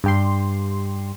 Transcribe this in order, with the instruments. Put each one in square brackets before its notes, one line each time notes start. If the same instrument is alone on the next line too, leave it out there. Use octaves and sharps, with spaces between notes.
[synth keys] G2 G4 C6